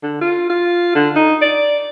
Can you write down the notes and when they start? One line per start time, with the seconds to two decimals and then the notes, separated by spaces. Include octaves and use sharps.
0.03 D3
0.21 F4
0.50 F4
0.95 D3
1.16 D#4
1.42 D5